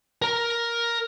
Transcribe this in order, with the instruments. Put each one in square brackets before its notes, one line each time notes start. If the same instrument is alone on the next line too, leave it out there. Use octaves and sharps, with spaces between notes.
[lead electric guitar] A#4 A#5